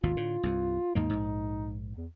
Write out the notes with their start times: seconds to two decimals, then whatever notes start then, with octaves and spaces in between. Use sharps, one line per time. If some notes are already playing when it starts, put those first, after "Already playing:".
0.03 G#1 D#2 B2 F4
0.17 A2 D3
0.43 C2 G2
0.95 D#2 G#2 A#3 D#4
1.10 A#1 G#2
1.97 E2